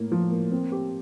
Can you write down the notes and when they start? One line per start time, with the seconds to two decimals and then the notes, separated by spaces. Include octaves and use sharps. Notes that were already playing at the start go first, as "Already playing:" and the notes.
Already playing: A2 A#3
0.12 F3
0.32 A#3
0.51 C4
0.72 G4